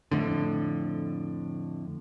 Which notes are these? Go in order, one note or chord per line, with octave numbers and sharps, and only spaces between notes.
F2 A2 D3